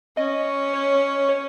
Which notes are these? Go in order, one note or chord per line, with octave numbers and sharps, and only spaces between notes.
C#4 D#5
C#5
C#5